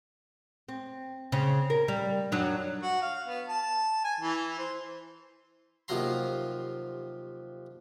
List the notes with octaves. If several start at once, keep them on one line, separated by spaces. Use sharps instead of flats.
C4
C#3 C4
A#4
G3
F#2 F#3 D4
F#4
F5
B3
A5
G#5
E3
C5
D#2 C3 F3 F#3 A#5 C6